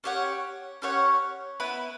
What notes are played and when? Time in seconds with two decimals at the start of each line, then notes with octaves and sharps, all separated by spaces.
0.04 C#4 G4 C#5 F#5
0.82 C#4 G4 C#5 F#5
1.60 B3 E4 B4